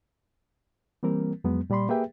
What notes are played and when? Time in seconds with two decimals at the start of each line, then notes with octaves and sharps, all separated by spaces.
1.03 E3 G3 A#3 C4 A#4
1.44 F2 F#3 G#3 B3
1.70 A#2 G3 D5 B5 C6
1.89 A#3 G4 G#4 B4 E5 G5